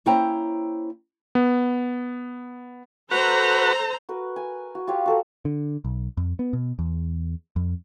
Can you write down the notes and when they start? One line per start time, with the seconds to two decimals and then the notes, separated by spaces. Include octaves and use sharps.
0.06 A#3 C#4 E4 C5 G5 A#5
1.35 B3
3.11 F#4 A4 B4 C5 A#5
4.09 F#4 A#4 B4
4.36 G#5
4.75 F#4
4.87 F4 G4 C#5 F5
5.06 F#4 A4 A#4
5.45 D3
5.84 B1
6.17 F2
6.39 B3
6.53 B2
6.79 E2
7.56 F2